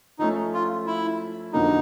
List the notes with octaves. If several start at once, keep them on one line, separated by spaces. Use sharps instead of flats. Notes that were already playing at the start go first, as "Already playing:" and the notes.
F3 A3 C#4 D#4
F4
E4
F2 D3 F#3 A#3 C#4 D#4